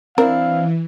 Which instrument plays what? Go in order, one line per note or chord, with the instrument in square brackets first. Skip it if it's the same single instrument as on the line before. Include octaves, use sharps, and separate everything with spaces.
[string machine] E3 [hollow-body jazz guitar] C4 D4 E4 [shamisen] A#4 [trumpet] F5